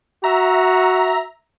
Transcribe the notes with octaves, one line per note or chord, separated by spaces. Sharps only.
F#4 E5 A#5